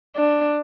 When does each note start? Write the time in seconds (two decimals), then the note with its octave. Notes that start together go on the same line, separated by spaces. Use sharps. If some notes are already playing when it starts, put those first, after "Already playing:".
0.16 D4